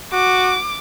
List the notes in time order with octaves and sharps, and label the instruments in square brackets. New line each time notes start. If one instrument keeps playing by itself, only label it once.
[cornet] F#4 [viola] D6